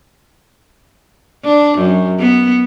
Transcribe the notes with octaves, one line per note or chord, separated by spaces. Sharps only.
D4
F#2
B3